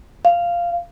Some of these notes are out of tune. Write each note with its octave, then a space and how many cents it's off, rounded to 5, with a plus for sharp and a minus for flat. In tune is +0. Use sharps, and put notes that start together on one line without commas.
F5 -10